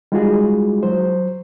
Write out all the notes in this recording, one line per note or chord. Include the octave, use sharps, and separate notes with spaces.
G3 G#3 D#4 F4 F#4 G#4
F#3 C5